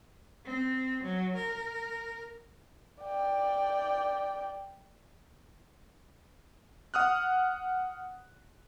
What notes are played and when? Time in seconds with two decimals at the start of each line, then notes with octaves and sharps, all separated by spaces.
0.46 C4
1.03 F#3
1.36 A#4
3.03 D5 G5
6.94 F#5 D#6 F6 F#6